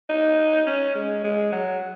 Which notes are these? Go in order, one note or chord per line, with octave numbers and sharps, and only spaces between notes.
D#4
C#4
G#3
G#3
F#3